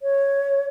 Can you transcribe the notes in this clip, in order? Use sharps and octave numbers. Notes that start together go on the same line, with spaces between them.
C#5